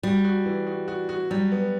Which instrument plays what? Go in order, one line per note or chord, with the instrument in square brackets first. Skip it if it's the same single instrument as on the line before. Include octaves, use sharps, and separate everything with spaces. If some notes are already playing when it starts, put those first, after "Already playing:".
[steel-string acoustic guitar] G3 [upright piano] F#4
[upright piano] F#4
E3
F#4
F#4
F#4
[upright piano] F#3 [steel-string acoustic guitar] G3
[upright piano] B3